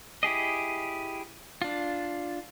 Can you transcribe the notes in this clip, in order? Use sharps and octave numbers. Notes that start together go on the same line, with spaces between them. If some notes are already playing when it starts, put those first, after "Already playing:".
E4 G4 G#4 D#5
D4 F4